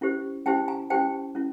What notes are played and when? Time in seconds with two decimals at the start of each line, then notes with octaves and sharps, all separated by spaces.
0.01 C#4 E4 G4 C5
0.46 C#4 E4 G4 C5 G5 A5
0.68 G#5 A#5
0.90 C#4 E4 G4 C5 G5 A5
1.35 C#4 E4